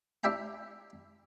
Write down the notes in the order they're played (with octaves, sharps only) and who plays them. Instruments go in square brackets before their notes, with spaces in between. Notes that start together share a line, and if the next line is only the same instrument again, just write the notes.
[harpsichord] D4 E4 G4 E5 G5 A#5